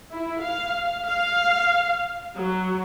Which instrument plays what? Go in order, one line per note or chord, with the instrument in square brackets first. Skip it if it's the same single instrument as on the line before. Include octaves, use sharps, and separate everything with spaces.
[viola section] E4
F5
F5
F#3